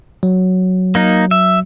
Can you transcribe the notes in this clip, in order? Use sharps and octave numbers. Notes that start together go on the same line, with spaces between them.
F#3
A#3 D#4
E5